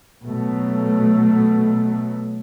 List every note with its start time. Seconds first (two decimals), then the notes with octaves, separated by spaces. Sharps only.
0.24 B2 F#3 A3